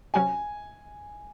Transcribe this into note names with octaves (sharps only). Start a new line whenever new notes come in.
C3 F#3 C#4 F#4 G#5